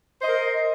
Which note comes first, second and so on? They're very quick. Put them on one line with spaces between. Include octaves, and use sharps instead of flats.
C5 D#5 A#4